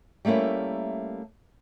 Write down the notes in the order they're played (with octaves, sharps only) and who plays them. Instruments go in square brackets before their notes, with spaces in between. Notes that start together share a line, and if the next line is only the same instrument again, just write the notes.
[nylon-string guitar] G3 A3 A#3 C#4 E4